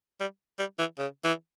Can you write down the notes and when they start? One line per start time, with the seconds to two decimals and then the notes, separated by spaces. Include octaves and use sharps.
0.20 G3
0.59 G3
0.79 E3
0.98 C#3
1.24 E3